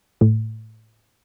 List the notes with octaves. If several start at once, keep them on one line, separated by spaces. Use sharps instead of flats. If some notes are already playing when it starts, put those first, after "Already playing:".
A2